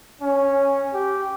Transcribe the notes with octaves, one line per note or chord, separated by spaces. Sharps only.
C#4
G4